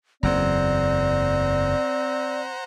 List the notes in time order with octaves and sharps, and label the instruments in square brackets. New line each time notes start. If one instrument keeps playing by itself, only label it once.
[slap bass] F#1 E2 [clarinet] C4 [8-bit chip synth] C5 F#5 A#5 [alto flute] D5